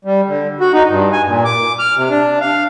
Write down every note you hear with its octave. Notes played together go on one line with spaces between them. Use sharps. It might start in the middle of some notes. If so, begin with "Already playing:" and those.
G3
D3
F#4
D#4
G2
G#5
A#2
D6
F6
C3
D4
F5